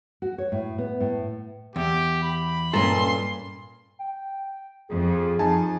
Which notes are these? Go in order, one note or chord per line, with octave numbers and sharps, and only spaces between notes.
F#4
C#5
A2
B3
A2
E2 G4
B5
G2 A#2 C#4 A4 D#5 A#5 C6
G5
F2 G#4
F2 D#4 G#5 A5